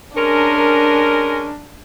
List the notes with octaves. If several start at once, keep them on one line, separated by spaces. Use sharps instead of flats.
G#3 C#4 D4 A#4